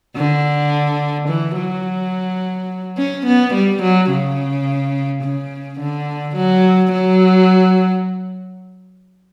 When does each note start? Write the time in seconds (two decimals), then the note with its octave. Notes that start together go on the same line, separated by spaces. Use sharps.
0.16 D3
1.29 E3
1.57 F#3
2.98 C#4
3.26 B3
3.54 G3
3.83 F#3
4.10 C#3
5.24 C#3
5.80 D3
6.36 F#3
6.92 F#3